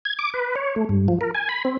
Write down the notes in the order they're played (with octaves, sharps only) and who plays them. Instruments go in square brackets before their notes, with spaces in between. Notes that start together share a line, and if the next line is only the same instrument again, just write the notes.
[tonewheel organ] G#6
D6
B4
C#5
A3
G2
F3
A#4
G#5
B5
C4